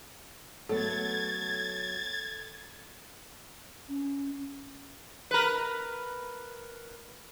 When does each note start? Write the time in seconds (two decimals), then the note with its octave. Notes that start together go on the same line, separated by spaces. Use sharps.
0.69 F#3 A3 B3 A4 G#6 A6
3.88 C#4
5.31 A#4 B4